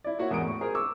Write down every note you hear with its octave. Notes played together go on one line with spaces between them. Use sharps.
E4 D5
A#3 E4 F#4 C#5 F#5
E2 G#2 A#4 F#5 D#6 D7
A2 C#6
G#4 A#4 C5
C#6 D6 E6